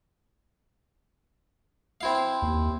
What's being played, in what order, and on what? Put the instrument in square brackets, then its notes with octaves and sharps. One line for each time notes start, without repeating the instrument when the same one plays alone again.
[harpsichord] C4 E4 F5
[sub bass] D#2